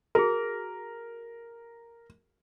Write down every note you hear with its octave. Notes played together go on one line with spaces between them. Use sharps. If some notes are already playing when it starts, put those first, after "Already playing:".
F#4 G#4 A#4